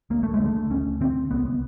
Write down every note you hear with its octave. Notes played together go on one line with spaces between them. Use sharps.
D2 A#3
A3
G#3
D3
A3
D2 C#4
D3 C4
C2 B3
B3